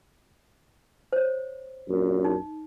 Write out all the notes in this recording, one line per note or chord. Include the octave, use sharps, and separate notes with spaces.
C5 C#5
A#1 F#2
D#4